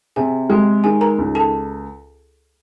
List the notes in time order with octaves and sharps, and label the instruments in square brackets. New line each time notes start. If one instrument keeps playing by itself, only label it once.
[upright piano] C3 [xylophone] G#4 G#5
[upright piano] G#3 [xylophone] G4 G5
[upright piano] D#3 [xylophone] G#4 G#5
[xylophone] A#4 A#5
[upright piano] C#2
[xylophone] A4 A5